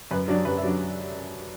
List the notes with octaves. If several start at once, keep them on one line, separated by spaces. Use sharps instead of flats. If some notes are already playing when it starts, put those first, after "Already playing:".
F#2 B4
F#3 D4 D5
F#2 B4
E5
F#3 D4 D5